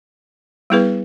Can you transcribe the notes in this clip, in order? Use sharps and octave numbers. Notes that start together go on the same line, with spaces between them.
G3 B3 E4 G#4 B4